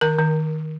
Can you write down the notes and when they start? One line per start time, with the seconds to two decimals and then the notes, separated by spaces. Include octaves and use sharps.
0.01 D#3 A#4
0.19 D#3